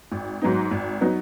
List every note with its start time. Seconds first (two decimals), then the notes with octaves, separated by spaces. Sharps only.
0.12 G#1
0.42 G#2 F#3 B3 D#4
0.71 G#1
1.01 F#3 B3 D#4